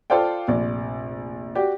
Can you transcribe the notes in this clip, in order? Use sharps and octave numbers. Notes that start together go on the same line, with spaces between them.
F4 A4 C5 D5 F5 G5
F1 A#1 D5
F#4 G4 D5